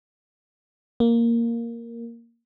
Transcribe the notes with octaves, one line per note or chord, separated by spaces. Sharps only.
A#3